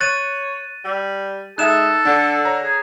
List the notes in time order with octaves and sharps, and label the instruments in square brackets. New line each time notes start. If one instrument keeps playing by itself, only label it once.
[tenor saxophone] C#5 [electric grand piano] F#6 [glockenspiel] A6 D#7
[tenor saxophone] G3
[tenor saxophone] G#3 [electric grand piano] D#4 E5 [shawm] A4 [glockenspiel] F#6 E7
[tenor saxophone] D3 [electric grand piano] D4
[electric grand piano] C#5 A#5
[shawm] G#4